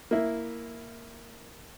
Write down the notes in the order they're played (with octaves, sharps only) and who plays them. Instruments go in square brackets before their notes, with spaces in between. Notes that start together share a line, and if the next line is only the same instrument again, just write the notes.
[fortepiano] A#3 E4